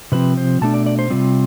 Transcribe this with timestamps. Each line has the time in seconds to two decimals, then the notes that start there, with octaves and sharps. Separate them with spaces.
0.12 C3 F3 C4 B4
0.37 C5
0.61 B2 A3 D4 A5
0.74 D5
0.86 D5
0.99 C5
1.10 C3 G3 C4 F4